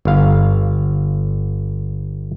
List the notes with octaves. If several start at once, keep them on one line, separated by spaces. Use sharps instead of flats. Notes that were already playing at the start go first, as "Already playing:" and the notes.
G1 F5